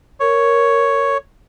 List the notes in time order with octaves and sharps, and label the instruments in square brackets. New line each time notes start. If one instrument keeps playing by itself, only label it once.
[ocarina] A#4 [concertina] C#5